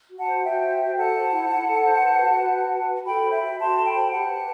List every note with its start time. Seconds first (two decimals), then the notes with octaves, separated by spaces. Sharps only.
0.10 F#4
0.18 F#5 A5
0.28 C5
0.44 F#4 E5 G5
0.63 C5
0.79 F#4
0.97 A4 F#5 A5
1.15 C5
1.32 E4
1.49 E4
1.67 A4
1.84 C5
2.02 B4
2.20 F#4
2.37 B4
2.54 F#4
2.71 B4
2.90 F#4
3.06 A4 G5 B5
3.25 C5
3.32 E5 G5
3.42 F#4
3.59 F#4 A5 C6
3.77 A4
3.85 G5 B5
3.95 C5
4.11 G4 F#5 A5
4.29 B4